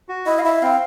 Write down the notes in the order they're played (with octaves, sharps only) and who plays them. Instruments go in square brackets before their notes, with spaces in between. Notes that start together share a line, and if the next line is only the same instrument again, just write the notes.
[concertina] F#4
[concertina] E4 [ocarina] D#5
[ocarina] F5
[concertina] E4 [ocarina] E5
[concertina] C4 [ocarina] F5